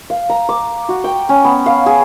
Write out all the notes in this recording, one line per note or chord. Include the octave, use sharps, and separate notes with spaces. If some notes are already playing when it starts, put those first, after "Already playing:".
F5
A#5
D6
F#4
G5
C#4
B3
F5
G#4